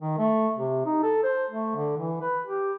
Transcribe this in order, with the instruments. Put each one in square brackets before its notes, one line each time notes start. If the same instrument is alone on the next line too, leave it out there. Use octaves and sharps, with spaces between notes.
[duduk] D#3
A3
C3
D#4
A4
C5
A3
D3
E3
B4
G4